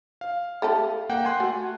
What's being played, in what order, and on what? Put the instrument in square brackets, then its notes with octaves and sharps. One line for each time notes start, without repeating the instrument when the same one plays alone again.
[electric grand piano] F5
[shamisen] A3 G4 A4
[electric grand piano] A#3 F#5 G5
G#5 C6 F#6
[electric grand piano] A3 [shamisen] F#4